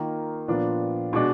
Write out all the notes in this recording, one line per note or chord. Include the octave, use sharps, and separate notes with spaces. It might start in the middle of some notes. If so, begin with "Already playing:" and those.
Already playing: D#3 A#3 F4
A#2 F3 B3 D4 F4
B2 G#3 D4